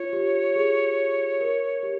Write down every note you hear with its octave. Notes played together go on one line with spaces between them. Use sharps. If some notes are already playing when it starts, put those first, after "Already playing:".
Already playing: F4 C#5
G4
G#4
A#4
G4